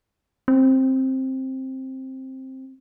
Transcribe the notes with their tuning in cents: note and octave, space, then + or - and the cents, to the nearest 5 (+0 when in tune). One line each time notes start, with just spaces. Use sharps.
C4 +10